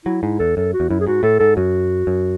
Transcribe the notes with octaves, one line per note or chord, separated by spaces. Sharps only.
F#3 E4
G#2 E4
E2 A4
F#2 A4
F#4
E2
F#2 E4
G#4
G#2 F#4
A2 A4
G#2 A4
F#2 F#4
F#2